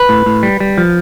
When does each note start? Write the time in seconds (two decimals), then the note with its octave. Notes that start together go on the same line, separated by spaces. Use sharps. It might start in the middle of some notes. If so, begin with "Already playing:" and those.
Already playing: B4
0.09 A2
0.26 A2
0.43 G3
0.60 G3
0.78 F3